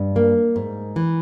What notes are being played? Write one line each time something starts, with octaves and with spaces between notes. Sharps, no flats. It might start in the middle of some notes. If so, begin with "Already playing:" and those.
Already playing: G2
A#3
G#2
E3